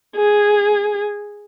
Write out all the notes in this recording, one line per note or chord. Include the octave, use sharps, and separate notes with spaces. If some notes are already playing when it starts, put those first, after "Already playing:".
G#4